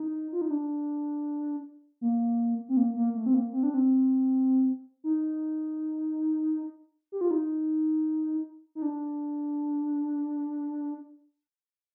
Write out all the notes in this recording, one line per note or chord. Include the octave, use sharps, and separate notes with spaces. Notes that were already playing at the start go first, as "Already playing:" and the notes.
Already playing: D#4
F4
D#4
D4
A#3
C4
A#3
A#3
A3
C4
A#3
C4
D4
C4
D#4
G4
F4
D#4
D#4
D4